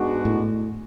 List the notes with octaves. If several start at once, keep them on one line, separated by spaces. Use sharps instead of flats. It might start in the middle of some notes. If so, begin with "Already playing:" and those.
Already playing: G#2 G#3 B3 D4 F#4
A2